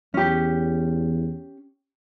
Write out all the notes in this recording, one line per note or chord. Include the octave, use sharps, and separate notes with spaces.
E2 C#4 G4